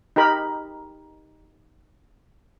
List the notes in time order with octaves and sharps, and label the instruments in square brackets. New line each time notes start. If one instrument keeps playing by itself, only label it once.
[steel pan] D#4 G4 A#4 B5